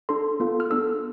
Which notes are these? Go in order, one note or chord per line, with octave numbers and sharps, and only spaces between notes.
D4 A4 C6
B3 F4 A4
F6
B3 D4 A4 E6